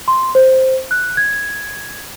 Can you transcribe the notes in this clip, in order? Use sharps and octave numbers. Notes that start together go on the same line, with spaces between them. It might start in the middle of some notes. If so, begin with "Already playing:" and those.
C6
C5
F#6
G#6